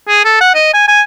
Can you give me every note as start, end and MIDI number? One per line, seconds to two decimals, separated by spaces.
0.08 0.24 68
0.25 0.38 69
0.41 0.52 78
0.55 0.73 75
0.74 0.85 80
0.88 1.01 80